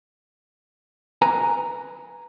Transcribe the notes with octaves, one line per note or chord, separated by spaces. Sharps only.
B4 G#5 A#5